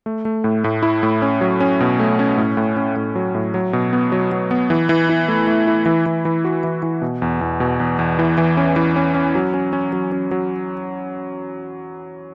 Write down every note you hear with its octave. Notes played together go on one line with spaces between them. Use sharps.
A3
A3
A2
A2
E4
A2
C#4
F#3
C#4
B2
A3
C#4
A2
A2
C#4
A2
F#3
A2
F#3
B2
B3
F#3
F#3
B3
E3
E3
E4
A3
A3
E4
E3
E3
E3
F#4
E3
E3
B2
E2
E2
B2
E2
E2
E3
E3
C#4
E3
C#4
C#4
F#3
C#4
C#4
F#3
C#4
F#3